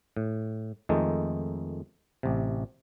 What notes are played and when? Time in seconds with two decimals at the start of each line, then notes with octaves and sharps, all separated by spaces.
0.17 A2
0.89 F2 D#3 G#3 A3 D#4
2.23 A1 C3